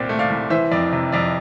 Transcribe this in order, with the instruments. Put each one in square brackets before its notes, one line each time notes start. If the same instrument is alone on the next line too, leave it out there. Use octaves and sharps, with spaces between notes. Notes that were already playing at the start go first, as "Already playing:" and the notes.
Already playing: [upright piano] C2 A#2 C4 D5
A3
D5 F5
C2
E3 C5 E5
F2 D5
C3
F2 D5